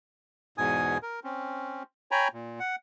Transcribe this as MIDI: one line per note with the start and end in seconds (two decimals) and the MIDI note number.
0.58 0.98 40
0.58 0.98 44
0.58 0.98 47
0.58 0.98 80
0.58 0.98 87
1.03 1.20 70
1.24 1.83 60
1.24 1.83 61
2.11 2.28 73
2.11 2.28 79
2.11 2.28 80
2.11 2.28 82
2.11 2.28 83
2.33 2.59 46
2.59 2.76 78